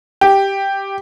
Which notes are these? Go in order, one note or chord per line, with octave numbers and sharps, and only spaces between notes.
G4